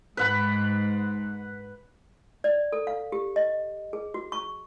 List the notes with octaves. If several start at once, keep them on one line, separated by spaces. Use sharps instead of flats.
G#2 B4 F#5 B5
D5
A4
F5
G4
D#5
G#4
F#4
C#6